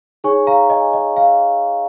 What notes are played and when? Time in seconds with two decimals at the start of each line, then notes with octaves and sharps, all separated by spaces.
0.24 D#4 G#4 C#5 G#5 C#6
0.47 F5 A#5
0.70 D#5 G#5
0.93 D#5
1.16 F5